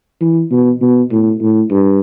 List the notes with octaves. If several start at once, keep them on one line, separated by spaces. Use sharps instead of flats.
E3
B2
B2
A2
A2
G2